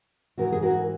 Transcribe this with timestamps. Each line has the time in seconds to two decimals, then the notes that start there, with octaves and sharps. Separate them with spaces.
0.38 G#2 E3 F#4 A#4
0.52 G#4
0.62 F#4 A#4